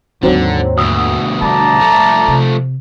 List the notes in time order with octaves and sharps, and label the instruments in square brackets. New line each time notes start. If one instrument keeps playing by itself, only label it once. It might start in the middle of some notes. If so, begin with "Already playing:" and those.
[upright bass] D#2 G#2 [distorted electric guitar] D3 [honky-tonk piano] D#3 F#3 C4
[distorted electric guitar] D2 B2 [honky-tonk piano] D#6 E6
[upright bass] G3 [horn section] D5 A5 A#5
[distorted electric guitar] F3 A3
[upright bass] C3